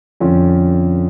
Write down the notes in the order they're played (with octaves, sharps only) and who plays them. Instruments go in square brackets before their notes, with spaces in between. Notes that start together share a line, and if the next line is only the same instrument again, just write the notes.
[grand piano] F2 D3 F3 C#4